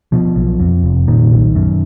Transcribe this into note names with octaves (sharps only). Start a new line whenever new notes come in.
B2 F3
B1
F2
F1
A#2 D#3
B1
F#2